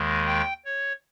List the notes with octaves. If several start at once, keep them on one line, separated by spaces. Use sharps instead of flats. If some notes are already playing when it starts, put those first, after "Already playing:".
Already playing: D#2 D#3 G#3
G5
C#5